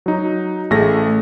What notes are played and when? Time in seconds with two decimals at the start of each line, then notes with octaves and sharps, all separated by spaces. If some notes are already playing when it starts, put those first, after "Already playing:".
0.06 F#3 D#4
0.70 A1 A3 G#4 A#6